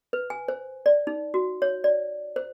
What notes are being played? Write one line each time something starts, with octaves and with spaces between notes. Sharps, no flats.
B4
G#5
C5
D5
D#4
F#4
C#5
D5
C5